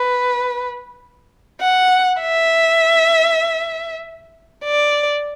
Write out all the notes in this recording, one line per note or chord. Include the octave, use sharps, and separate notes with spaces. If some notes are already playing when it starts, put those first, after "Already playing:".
Already playing: B4
F#5
E5
D5